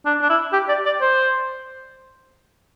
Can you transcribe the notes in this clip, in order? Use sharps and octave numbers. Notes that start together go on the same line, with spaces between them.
D4
D4
E4
G4
D5
D5
C5